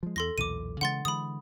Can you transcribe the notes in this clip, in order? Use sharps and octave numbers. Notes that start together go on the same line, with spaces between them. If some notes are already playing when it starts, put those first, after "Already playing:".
F3 G#3
E2 A4 C6 A#6
B1 E2 A#2 D6 D#7
C#3 E3 G#3 F#5 C6 A6
D3 E3 G#3 B5 D#6